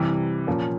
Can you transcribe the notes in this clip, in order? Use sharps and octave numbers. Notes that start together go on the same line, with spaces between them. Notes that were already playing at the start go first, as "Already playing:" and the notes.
Already playing: C3 E3 G3
A#2 F3 A#3 C#4